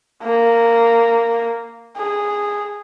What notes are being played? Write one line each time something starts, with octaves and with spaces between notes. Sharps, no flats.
A#3
G#4